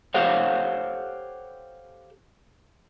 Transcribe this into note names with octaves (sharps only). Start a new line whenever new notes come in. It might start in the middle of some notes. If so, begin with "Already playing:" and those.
G4 A4 C5 C#5 F5 F#5